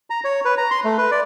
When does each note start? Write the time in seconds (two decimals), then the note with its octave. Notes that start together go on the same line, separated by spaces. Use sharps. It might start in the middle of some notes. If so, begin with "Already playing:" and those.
0.10 A#5
0.24 C#5
0.45 B4
0.58 A#5
0.71 C6
0.84 A3
0.98 B4
1.11 D5